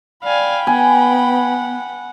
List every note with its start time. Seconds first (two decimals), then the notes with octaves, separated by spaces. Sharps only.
0.24 D5 F5 G5 G#5 B5
0.67 B3 F#5 G#5